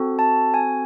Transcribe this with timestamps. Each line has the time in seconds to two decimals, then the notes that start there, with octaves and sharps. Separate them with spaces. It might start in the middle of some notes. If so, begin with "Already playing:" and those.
Already playing: C4 F#4 A4
0.19 A5
0.54 G#5